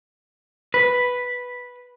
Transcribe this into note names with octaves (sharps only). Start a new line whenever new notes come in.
B4